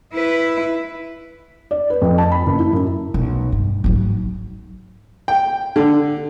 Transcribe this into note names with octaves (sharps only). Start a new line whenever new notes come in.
E4 B4
D5
B4
F2
A5
B5
F#1
E4
F#2
B1
G2
G#2 F#3
G5
D3